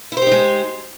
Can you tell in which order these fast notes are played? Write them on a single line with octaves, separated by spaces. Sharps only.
E4 C5 G4 D#4 G#3